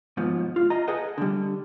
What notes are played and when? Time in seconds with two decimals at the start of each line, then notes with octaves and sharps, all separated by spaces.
0.17 D#2 G#2 B2 F3 B3
0.56 F4
0.70 F4 D#5 A#5
0.88 G#4 A4 B4 D#5 F#5 G5
1.18 D3 G3